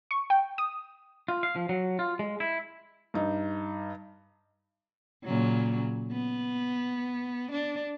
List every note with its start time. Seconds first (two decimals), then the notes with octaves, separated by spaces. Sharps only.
0.11 C#6
0.30 G5
0.58 D#6
1.28 F4
1.43 F5
1.56 F3
1.69 F#3
1.99 F4
2.19 G#3
2.40 E4
3.14 G2 D#4
5.24 A#2 C#3 F#3
6.12 B3
7.52 D4